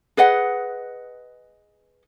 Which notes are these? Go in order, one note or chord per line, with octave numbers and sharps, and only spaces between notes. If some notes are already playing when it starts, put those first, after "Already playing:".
G#4 B4 D#5 F#5